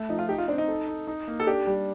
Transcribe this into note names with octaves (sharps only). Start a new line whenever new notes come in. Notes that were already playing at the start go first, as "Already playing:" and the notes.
Already playing: A3
F3 D#4
F4
D#4 G4
F4
C4 D4
D#4
A4
D#4
D#4
A#3
A4
D4 G4
G3